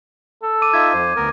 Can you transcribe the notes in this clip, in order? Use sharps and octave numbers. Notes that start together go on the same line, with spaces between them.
A4
D6 D#7
D#4 F4 E5 G#6
F2 C5
D2 B3 A#4